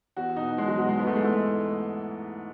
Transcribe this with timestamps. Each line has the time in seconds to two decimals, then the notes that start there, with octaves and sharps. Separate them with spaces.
0.17 E2 F#4
0.36 B2 D#4
0.58 E2 G#3
0.68 F#3
0.78 B2 F#3
0.89 G#3
0.98 G#2 B3
1.07 A3
1.16 E3 G#3
1.25 A3